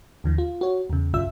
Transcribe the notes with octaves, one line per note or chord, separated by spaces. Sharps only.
D#2 D3 E3
F4
F#4 C#5
E2 C#3
B1 F#2 C#3 F4 E5 E6